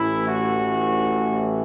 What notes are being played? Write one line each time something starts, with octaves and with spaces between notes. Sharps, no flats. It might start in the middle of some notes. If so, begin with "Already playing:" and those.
Already playing: A1 A2 E3 E4
F#4